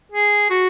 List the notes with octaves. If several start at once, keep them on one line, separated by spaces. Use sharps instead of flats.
G#4
F#4